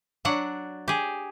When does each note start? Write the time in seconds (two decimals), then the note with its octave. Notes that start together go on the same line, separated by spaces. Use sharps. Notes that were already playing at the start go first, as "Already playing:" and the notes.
0.25 F#3 D4 F#5
0.88 G4 G#4